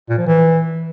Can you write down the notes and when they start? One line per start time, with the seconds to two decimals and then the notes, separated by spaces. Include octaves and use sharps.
0.09 A#2
0.18 F3
0.26 E3